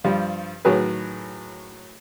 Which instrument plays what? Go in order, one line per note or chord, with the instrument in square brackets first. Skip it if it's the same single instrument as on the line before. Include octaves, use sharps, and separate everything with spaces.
[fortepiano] G2 F3 G3
A2 D#3 F#3 F#4 G#4 B4